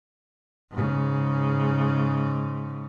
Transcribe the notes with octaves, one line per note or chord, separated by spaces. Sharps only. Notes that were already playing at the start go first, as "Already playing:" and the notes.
G#2 C#3